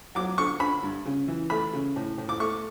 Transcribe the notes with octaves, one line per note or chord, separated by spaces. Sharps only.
F#3 D6
D3 C#6
D3 B5
G2
C#3
E3
A3 B5
C#3
A2
A2
D6
A3 C#6